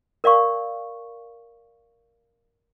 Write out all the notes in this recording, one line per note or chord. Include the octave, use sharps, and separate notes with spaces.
A#4 D5 F5 C#6